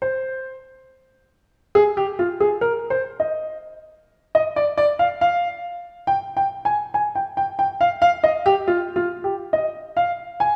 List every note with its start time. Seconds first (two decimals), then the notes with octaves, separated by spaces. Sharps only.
0.02 C5
1.75 G#4
1.97 G4
2.19 F4
2.40 G#4
2.61 A#4
2.90 C5
3.20 D#5
4.35 D#5
4.56 D5
4.78 D5
4.99 F5
5.21 F5
6.07 G5
6.37 G5
6.65 G#5
6.94 G#5
7.15 G5
7.37 G5
7.59 G5
7.81 F5
8.02 F5
8.24 D#5
8.46 G4
8.68 F4
8.96 F4
9.24 G4
9.53 D#5
9.97 F5
10.40 G#5